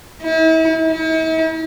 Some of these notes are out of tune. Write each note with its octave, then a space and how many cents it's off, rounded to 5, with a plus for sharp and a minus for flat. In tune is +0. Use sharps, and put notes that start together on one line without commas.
E4 -40
E4 -45